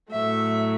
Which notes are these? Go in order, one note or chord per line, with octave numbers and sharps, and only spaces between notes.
A2 F#3 A3 E5